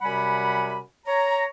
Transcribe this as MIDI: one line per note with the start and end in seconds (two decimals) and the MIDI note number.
0.02 0.79 42
0.02 0.79 48
0.02 0.79 55
0.02 0.79 78
0.02 0.79 80
0.02 0.79 83
1.06 1.45 73
1.06 1.45 82